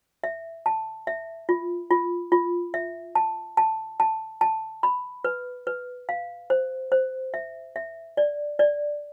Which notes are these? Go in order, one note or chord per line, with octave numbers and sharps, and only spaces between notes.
E5
A5
E5
F4
F4
F4
E5
A5
A5
A5
A5
B5
B4
B4
F5
C5
C5
E5
E5
D5
D5